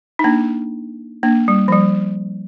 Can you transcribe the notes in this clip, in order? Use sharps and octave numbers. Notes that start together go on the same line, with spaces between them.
D#4
A#3 D4
A#3 D4
G3
F3
G3